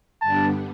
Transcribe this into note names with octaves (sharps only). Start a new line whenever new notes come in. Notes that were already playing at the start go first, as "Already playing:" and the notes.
G2 D3 G3 B3 D4 A5